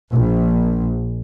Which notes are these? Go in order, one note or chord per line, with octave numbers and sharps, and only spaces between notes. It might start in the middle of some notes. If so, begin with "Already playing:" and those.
A#1